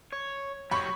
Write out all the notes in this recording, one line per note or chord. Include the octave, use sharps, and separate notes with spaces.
C#5
F#3 G4 C#5 B5 C#6